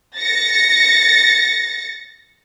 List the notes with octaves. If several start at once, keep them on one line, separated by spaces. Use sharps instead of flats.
A6 A#6 C#7